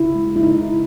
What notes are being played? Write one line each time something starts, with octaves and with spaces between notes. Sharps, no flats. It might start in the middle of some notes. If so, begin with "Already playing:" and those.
Already playing: C#3 E4
G#3
C#3 E4
D#4
E4
C#3